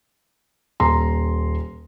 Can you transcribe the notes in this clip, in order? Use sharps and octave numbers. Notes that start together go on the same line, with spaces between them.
D#1 A#5 C6